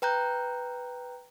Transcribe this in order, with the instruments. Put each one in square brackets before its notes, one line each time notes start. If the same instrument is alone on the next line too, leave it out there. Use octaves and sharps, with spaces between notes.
[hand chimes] B4 G5 A#5 F#6 G6